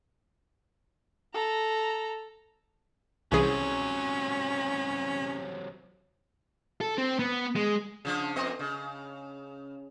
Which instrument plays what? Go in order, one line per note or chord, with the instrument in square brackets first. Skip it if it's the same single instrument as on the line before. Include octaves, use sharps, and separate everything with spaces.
[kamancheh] A4 A#5
[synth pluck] C2 E3 G#4 [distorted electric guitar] C3 F#3 [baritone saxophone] C#4
[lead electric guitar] A4
C4
B3
G#3
[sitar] C#3 F3 D4
F2 B3 D#5
C#3